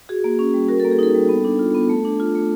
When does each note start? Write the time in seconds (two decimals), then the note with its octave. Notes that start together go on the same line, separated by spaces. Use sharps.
0.09 F#4 G#4
0.24 A#3
0.39 C#4
0.54 G3
0.68 F#4 A#4
0.80 A#3 A4
0.91 G#4
0.99 D#4 A4
1.15 G3
1.29 B3
1.45 D4
1.59 F4
1.74 B3
1.89 A3
2.05 D4
2.20 F4
2.35 A3